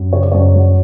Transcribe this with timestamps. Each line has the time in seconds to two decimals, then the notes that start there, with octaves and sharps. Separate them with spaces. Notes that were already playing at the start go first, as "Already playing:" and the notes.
Already playing: F#2
0.13 C#3 C#5
0.22 D5
0.32 F#2 C#5
0.56 F#3